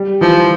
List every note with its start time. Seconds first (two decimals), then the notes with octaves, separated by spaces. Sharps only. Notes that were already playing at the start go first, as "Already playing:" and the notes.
Already playing: G3
0.21 E3 F3